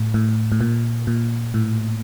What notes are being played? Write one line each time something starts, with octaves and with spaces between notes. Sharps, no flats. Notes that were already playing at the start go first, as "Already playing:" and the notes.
Already playing: A2
A2
A2
A#2
A#2
A2